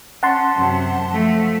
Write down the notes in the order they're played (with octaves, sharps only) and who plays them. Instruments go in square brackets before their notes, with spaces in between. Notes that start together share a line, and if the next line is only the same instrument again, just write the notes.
[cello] C#4 [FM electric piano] F#5 A5 C6
[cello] F#2 C3
F3 A3